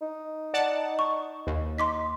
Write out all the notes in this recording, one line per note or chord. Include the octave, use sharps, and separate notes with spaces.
D#4
D5 F#5 A5
C#6
D#2
D#4 C6 D6 B6